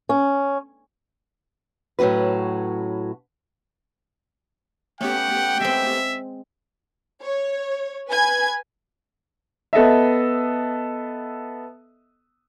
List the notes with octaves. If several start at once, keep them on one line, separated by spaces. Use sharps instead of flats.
C#4
A2 F#3 C#4 F#4 B4
A3 B3 C#4 G4 F#5 G5
G#3 C4 E5
C#5
B4 G#5 G#6
B3 A4 D#5 E5